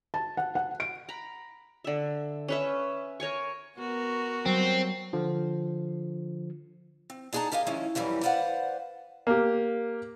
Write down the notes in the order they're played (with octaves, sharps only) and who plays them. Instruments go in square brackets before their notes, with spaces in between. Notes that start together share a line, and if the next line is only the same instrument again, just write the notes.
[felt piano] A5
F#5
F#5
D7
[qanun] A#5 B5
D3 E5
C#4 B4 E5
A#4 C#5 G#5 C#6
[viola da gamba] B3 F#4 A#4
[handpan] F#3 G3 [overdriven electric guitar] C4
[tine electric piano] D3 F3
[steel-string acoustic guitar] C4
D4 D#4 G#4 F#5 A5 A#5
G4 A#4 D#5 F5 G#5
D#3 F3 G#3 C#4 E4
F2 E3 F#3 G3 C#4
B4 C5 D5 F5 F#5
[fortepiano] A#3 G4